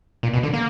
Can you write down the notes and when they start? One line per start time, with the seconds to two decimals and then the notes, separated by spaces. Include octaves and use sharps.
0.23 A#2
0.33 B2
0.43 D3
0.53 A#3